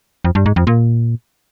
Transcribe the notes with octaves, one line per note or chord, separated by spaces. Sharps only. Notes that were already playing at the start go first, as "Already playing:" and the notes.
F2
G2
G#2
F2
A#2